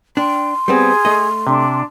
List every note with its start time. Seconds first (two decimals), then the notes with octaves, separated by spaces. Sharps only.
0.17 D4 G5 C6
0.68 G3 B3 C4 G#4
1.05 A3 D#5
1.47 C3 D4